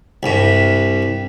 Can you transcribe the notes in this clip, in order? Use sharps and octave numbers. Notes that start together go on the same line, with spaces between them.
C2 G2